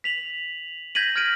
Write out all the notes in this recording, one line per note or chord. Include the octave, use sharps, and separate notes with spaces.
B6 F7 F#7
G6 G#6 A#6 B6 D#7 F#7
F6 G#6 A#6 D7 D#7